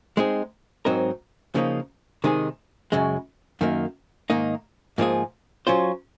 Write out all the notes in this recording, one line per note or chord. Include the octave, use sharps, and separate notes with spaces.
G#3 C4 D#4 G#4
G#2 F#3 C4 D#4 A#4
C#3 F3 A#3 D#4
C3 D#3 G#3 D#4 G#4
F#2 C#3 G#3
F#2 D#3 A#3
G#2 D#3 A#3 D#4
G#2 F3 A#3 F4 G#4
F#3 C#4 F4 C5